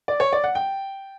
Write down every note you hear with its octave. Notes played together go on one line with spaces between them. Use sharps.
D5
C#5
D5
F#5
G5